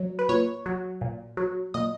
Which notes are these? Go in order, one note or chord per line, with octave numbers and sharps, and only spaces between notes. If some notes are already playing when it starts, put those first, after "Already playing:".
Already playing: F#3
B4
A#2 C#5
F#3
A#2
F#3
A#2 D#5